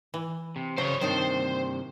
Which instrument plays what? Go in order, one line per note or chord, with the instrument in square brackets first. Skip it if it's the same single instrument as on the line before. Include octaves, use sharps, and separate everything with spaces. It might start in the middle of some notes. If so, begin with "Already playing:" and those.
[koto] E3
[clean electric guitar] C3
[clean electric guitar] C#3 [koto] F#3 [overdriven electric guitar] C5 C#5
[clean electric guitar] G2 C3 [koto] D#3 G5 A5 [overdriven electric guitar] C5